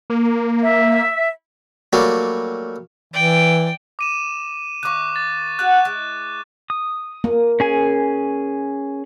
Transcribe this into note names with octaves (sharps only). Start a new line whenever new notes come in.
A#3
E5
F#3 G3 A3 A#3 D4 F#4
E3 D5 G5
D6 D#7 E7
D#3 F5 C#6 D6 F#6
A6
F#4 F#5 F#6
G#3 E4
D#6
A#3
C#4 G#4 G#5